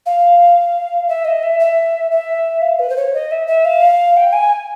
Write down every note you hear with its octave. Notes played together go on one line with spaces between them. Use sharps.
F5
E5
D#5
E5
E5
E5
F5
B4
C5
C#5
D#5
E5
E5
F5
G5
G#5